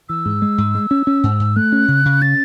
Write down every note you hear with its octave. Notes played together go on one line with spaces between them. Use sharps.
E3 E6
G#2
G#3
G#2
G#3
C#4
C#4
G#2
G#2
A3 F#6
C#4
C#3
C#3
C#4 A6